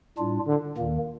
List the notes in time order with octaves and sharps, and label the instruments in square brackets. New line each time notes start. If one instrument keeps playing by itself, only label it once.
[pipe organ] A2 G3 D4 F4
[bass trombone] D3
[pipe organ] D#2 D#3 A#3 [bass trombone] A#2